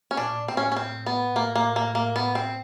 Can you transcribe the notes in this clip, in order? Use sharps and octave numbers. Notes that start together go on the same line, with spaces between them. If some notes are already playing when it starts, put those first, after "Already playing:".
C#4
A#2 D4
A2 C4
C#4
C#4
C4
B3
A2 A#3
A#3
A#3
A#3
B3
C4